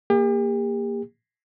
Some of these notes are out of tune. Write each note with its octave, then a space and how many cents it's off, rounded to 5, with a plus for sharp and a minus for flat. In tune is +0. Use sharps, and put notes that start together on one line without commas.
A#3 +0 G4 +40